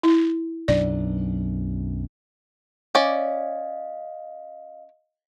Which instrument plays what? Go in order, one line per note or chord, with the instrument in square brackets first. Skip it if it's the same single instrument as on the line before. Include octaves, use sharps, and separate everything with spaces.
[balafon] E4
[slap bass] B1 F#2 D4 [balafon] D5
[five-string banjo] C#4 D5 [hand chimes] D#5 F5